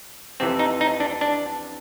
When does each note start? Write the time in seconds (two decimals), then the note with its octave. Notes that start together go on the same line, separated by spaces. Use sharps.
0.40 F2 C3 E3 C4
0.59 D#4
0.81 D#4
1.00 D4
1.21 D4